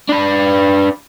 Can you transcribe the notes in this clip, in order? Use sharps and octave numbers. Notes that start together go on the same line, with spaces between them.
D4 B4